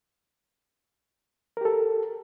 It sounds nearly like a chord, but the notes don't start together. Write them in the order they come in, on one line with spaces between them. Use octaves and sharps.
A#4 G4 A4